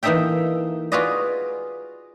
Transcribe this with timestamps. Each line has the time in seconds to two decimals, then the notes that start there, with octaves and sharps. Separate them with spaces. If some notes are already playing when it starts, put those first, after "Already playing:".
0.03 E3 A#3 D#4 A4 E5 G5
0.92 F4 F#4 G#4 B4 D5 D#5